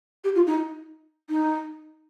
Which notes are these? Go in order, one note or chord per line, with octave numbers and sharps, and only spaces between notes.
G4
F4
D#4
D#4